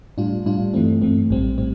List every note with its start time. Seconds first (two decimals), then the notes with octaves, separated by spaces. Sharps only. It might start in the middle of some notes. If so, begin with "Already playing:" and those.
0.18 A2 G3 D4 F4
0.45 A2 G3 D4 F4
0.74 G2 E3 A3 C4
1.01 G2 E3 A3 C4
1.30 A#1 A2 G3 C4
1.58 A2 G3 C4